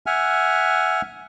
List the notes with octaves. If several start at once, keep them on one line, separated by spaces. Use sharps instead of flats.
E5 F#5 G#5 F6